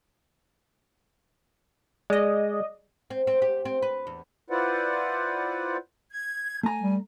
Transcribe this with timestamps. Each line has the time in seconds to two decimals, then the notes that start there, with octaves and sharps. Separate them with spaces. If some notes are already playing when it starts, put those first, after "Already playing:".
2.10 G#3 D5 D#5
3.10 C4
3.27 C4
3.42 G4
3.65 C4
3.82 B4
4.07 E2
4.50 E4 F4 B4 C5 D5 F#5
6.11 G#6
6.63 A3 G#5 A#5
6.81 G3